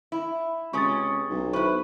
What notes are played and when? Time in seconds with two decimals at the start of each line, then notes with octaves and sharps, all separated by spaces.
0.12 E4
0.73 C#2 C3 C#4 C#6 D#6 A6
1.30 B1
1.53 E4 B4 C5 C#6